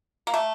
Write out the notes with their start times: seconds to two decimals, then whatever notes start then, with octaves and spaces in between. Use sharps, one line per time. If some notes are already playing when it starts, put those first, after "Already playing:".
0.27 A#3
0.34 A3